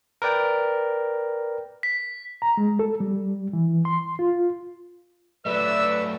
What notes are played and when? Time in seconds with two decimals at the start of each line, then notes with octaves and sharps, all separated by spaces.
0.22 A#4 B4 D5 G5
1.83 B6
2.42 A#5
2.57 G#3
2.79 A4
3.00 G3
3.53 E3
3.85 C6
4.19 F4
5.46 F#3 A3 B4 D5 E5 E6